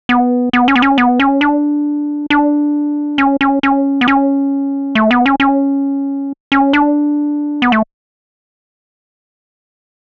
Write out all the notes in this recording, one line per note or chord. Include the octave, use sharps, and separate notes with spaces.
B3
B3
C#4
B3
C#4
B3
C#4
D4
D4
C#4
C#4
C#4
B3
C#4
A3
B3
C#4
C#4
C#4
D4
B3
A3